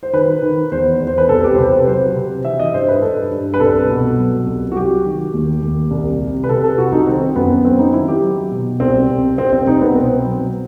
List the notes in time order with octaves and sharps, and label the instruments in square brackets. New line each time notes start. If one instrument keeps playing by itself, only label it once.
[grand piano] C5
D#3 B4
D#3
E2 C5
E2
C5
B4
C2 A4
G4
C5
C3 B4
B4
F#3 C5
C3
E3 E5
D#5
G2 C5
B4
G2 A4
G2
B4
C2 A4
B2
F#3
C2
F#4
F#3 G4
D#3
D#2
D#2
C2
C3
B4
C3 A4
A4
C2 F#4
D#4
D#3 C4
F#2 B3
F#3 C4
D#4
D#3 E4
G4
F#3
B2
C2 C4
C2
C2 C4
C4
C2 D#4
B3
B2 C4
F#3